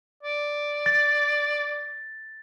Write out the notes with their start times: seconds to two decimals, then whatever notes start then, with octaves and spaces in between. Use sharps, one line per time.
0.23 D5
0.86 A6